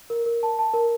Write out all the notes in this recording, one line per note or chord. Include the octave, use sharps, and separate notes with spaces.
A#4
A#4
A5
A5
A#4